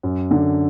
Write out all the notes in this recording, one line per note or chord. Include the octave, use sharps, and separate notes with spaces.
F#2
D3